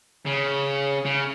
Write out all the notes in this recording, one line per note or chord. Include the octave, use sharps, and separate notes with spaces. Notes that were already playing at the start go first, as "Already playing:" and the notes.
C#3
C#3